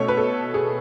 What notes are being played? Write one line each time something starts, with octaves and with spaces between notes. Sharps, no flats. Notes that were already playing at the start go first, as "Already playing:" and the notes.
Already playing: B2 A3 C#4 C#5
B4
A4
G#4